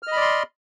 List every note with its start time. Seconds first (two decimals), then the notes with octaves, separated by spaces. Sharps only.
0.03 F6
0.07 D#5
0.12 B5
0.17 D5
0.21 C6